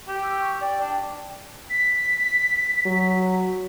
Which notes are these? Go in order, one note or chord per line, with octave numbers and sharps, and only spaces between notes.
G4
E6
C#6
D5 G5
D4
B6
F#3